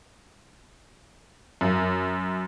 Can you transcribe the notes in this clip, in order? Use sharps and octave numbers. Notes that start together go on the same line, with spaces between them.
F#2